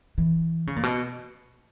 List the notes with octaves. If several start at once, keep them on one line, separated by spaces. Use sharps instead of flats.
E3
C#3
A#2
B2